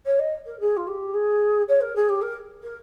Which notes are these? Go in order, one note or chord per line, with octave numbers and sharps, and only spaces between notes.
C#5
D#5
A#4
G#4
F4
G4
G#4
C#5
A#4
G#4
G4
A#4
A#4